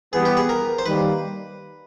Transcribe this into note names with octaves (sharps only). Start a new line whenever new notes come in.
E3 G3 B3 G#4
G4
G#4
A#4
C5
D#3 G3 A#3 B4